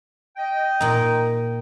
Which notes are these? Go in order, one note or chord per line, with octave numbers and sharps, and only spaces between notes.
D#5 G5
A#2 D#4